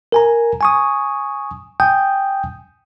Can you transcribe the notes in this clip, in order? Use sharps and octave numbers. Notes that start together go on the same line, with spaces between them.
A#4 G#5 A#5
G#5 C#6 D#6
G5 G#5 D#6 G6